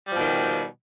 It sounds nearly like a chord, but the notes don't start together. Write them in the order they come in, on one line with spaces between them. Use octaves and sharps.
G3 F3 B2 D#3